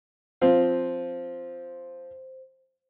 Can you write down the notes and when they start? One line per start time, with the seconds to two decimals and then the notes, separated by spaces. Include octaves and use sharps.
0.42 F3 C4 F4 C5